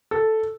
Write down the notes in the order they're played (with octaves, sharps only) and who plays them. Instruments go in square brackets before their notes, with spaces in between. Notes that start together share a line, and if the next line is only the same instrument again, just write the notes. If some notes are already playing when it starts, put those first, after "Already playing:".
[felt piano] A4